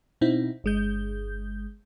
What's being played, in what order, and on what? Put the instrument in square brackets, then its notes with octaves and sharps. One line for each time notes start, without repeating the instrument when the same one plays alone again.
[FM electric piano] B2 C4 D#4 E4
G1 G#3 G6